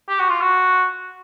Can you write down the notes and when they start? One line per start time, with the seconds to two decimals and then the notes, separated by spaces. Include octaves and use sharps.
0.09 G4
0.19 F#4
0.29 F4
0.41 F#4